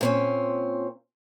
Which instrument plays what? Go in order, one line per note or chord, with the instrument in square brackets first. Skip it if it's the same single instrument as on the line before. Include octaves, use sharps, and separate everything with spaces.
[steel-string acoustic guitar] A#2 C4 C#4